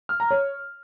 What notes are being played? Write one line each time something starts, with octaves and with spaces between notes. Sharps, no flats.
F6
A#5
C#5